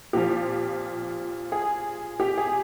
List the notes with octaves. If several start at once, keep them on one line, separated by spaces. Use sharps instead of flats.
A#2 F3 G4
G#4
G4
G#4